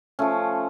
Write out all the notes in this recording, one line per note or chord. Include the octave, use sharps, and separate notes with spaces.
F3 A3 C#4